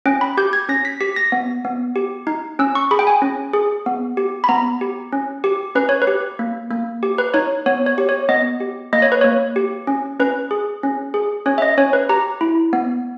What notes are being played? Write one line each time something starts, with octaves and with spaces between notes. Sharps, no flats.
C#4 G5
B5
G4 G6
G#6
C#4 A#6
B6
G4 B6
A#6
B3
B3
G4
D#4
C#4 E6
C#6
G#4 B5
G5
G#5
C#4
G#4
B3
G4
B5
B3 A#5
G4
C#4
G4
C#4 B4
C#5
B4
G4
A#3
A#3
G4
B4
D#4 C#5
B3 C#5
C#5
G4
C#5
B3 D#5
G4
A#3 D#5
C#5
B4
A#3 C#5
G4
C#4
C#4 B4
G#4
C#4
G#4
C#4 C#5
E5
D#5
C#4 C#5
B4
G4 A#5
E4
B3